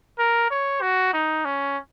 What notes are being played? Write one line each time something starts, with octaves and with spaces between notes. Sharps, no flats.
A#4
C#5
F#4
D#4
C#4